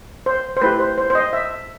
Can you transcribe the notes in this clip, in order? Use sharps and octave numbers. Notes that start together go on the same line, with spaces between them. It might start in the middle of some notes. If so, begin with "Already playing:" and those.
C5
C5
A3 E4 G4 B4
C5
C5
C5
D#5
E5